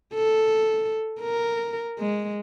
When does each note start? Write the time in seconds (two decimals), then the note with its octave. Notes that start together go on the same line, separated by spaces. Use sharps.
0.14 A4
1.20 A#4
1.99 G#3